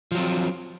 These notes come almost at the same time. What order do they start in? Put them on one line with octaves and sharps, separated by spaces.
F3 F#3 C4